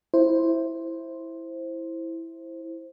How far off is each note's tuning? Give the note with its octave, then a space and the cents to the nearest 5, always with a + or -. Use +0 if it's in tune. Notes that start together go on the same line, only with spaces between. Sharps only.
E4 +0 C5 +5